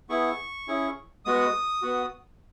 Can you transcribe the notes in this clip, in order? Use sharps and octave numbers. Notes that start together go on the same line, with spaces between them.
B3 E4 G#4 C#6
C#4 E4 G#4
G#3 B3 F#4 D#6
B3 F#4